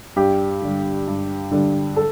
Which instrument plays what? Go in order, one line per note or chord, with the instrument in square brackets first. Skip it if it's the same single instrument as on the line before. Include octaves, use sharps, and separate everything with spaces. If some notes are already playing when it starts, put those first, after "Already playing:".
[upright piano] G2 G4
D3 G3
G2
D3 G3
A4